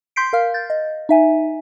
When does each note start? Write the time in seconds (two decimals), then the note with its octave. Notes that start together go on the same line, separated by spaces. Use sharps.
0.16 C6 G6 B6 C7 D7
0.33 A#4 F5 F6
0.54 G6 A6
0.70 D#5
1.09 D#4 E5 G#5